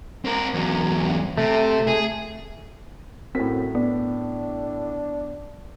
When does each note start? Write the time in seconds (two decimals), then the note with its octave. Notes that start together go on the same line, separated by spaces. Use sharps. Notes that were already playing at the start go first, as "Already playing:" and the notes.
0.25 C4 A#4
0.54 E2 F#3
1.38 C3 A3
1.87 G#4
3.35 F#2 A2 C4 B6
3.75 B3 D4